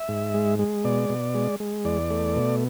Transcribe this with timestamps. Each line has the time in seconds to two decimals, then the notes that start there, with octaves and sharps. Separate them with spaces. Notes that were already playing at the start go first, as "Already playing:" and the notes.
Already playing: E5
0.09 G#2
0.34 G#3
0.59 G#3
0.84 B2 D5
1.10 B2
1.35 G#3
1.60 G#3
1.85 E2 D5
2.11 A3
2.36 B2